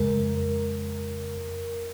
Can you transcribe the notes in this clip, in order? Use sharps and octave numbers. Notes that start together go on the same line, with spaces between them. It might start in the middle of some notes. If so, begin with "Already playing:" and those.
Already playing: F2 C#3 G#3 A#4